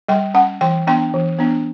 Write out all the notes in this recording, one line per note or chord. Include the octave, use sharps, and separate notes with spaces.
G3 G5
C#4 F#5
E3 G5
B3 D4 G5
E3
B3 D4